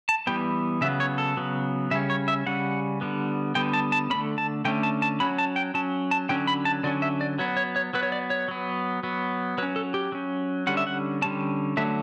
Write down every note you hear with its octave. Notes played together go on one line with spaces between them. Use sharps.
A5
E3 G3 B3 G5
C#3 F#3 B3 E5
C#5
A4
C#3 F#3 B3
C#3 G3 C#4 E5
C#5
E5
C#3 G3 C#4 F#5
D3 G3 B3
D3 G3 B3 G5
A5
A5
D3 A3 C#4 B5
A5
D3 A3 C#4 G5
A5
A5
F#3 C#4 B5
A5
G5
F#3 C#4 A5
A5
D3 F#3 C#4 G5
B5
A5
D3 F#3 C#4 D5
E5
D5
F#3 B3 C#5
C#5
C#5
F#3 B3 B4
C#5
D5
C#5
F#3 B3
F#3 B3
F#3 C#4 B4
A4
G4
F#3 C#4
D3 G3 C#4 F#5
E5
F#5
D3 G3 C#4 A5
D3 F#3 A3 E5